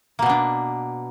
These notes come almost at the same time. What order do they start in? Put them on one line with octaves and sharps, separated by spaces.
A#3 B2 B3 D4